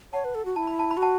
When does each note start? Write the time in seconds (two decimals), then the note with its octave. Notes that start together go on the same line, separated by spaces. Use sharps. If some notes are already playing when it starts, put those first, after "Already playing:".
0.13 C#5 F#5 A5
0.24 B4
0.35 A4
0.45 F#4
0.56 E4 A5
0.67 B5
0.79 A5
0.91 B5
0.97 F#4
1.02 F#5 A5